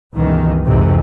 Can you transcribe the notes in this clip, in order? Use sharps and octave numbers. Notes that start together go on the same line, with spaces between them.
C#2 G2 B2 D#3 E3
C2 F2 G#2 C3 E3